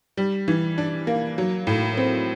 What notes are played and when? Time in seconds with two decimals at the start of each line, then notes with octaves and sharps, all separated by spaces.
0.17 G3
0.48 E3
0.78 D4
1.07 A#3
1.38 F#3
1.67 A2
1.97 C4